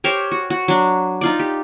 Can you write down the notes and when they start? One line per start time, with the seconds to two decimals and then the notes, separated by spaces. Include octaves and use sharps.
0.04 G4 A#4 C5 C#5
0.32 F#4
0.50 F#4
0.68 F#3 D4
1.21 D#4 F4 D5
1.40 G4